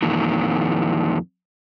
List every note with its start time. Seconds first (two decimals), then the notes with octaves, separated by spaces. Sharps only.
0.02 F2 A#2 D#3 E3